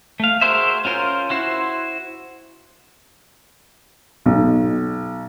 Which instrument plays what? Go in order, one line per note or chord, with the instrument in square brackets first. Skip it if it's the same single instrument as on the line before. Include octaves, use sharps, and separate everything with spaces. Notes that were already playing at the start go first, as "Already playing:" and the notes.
[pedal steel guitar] A3 F5
F#4 G#4 A#4 C5 E5
C#4 F4 A#4 C5
E4 F#4 C5
[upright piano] B1